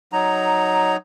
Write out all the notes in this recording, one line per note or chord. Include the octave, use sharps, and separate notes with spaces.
F#3 D#4 A#5